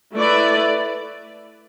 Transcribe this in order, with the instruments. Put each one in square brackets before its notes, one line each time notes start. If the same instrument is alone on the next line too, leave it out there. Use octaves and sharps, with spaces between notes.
[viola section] A3 E4 B4 D5